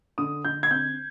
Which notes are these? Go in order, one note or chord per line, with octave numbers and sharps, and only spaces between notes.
D3 D#6
D3 G6
G#6
C4 G6